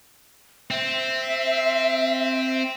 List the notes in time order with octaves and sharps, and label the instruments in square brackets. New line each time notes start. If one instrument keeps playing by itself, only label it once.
[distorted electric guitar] C4 [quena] E5